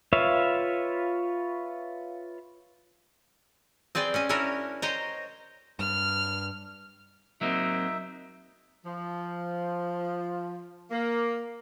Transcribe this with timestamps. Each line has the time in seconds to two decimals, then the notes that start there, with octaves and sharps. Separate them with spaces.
0.13 F4 B4 C#5 E5 F5
3.95 C4 G#4 B4 D5 G5
4.14 C#4 D#5 G#5
4.29 C#4 D4 E4 F#4 A#4 C#5
4.82 C5 C#5 D#5 G5 A#5
5.79 G2 F6
7.41 F#3 A#3 C4 D#4 E5
8.85 F3
10.91 A#3